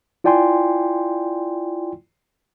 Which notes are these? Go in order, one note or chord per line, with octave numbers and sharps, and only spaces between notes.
E4 F4 D5 G5 G#5 C6